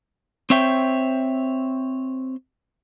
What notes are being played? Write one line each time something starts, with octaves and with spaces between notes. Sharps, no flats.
C4 C5 C#5 E5 G5